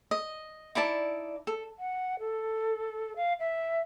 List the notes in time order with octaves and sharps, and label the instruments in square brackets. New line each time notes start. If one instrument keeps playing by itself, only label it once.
[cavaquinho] D#5
D#4 E4 D5 A5
A4
[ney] F#5
A4
F5
E5